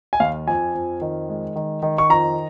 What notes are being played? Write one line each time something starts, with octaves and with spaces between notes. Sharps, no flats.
G#5
D#2 F5
F2 G#5
F2
D#3
G#3
D#3
D#3
C#6
F2 A#5